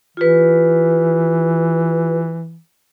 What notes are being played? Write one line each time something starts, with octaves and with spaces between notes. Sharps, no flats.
E3 F4 G4 B4